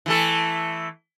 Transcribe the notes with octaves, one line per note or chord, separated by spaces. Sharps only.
E3 A3 A4